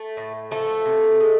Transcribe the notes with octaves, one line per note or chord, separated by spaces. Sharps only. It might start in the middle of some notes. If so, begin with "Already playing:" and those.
Already playing: A3
A2
F3 A3 A4
C3
G#3